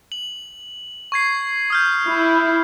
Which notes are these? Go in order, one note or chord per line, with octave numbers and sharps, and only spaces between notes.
F#7
C#6 G#6 C7
D#6 F6 G6
E4